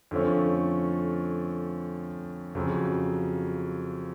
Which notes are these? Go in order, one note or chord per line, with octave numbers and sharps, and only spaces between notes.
F2 D3 F3 A3 C#4
F2 C#3 F#3